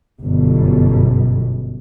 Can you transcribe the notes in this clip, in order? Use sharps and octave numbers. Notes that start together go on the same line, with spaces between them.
G1 F#2 B2